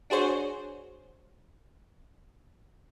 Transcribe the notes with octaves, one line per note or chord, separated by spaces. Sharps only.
D4 F#4 G#4 C5 C#5